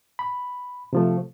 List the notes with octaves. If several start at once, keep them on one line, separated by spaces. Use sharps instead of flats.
B5
C3 F3 A3